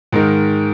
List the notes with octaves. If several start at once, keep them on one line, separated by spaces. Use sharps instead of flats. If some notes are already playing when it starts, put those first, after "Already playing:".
G#2 D#3 G#3 D#4 A#4